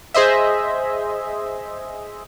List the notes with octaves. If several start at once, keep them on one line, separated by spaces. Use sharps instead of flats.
G#4 C5 D#5 E5